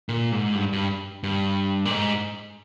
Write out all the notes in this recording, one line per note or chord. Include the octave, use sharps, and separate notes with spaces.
A#2
G#2
G2
G2
G2
A#2
G#2